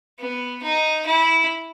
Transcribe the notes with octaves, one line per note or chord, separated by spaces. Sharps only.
B3
D#4
E4